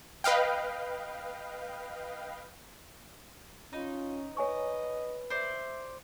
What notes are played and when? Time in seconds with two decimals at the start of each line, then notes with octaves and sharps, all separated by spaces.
0.24 B4 D#5 F5 G5
3.73 C#4 D#4 F4
4.37 B4 C#5 D#5 G#5 C#6
5.30 C5 D5 E5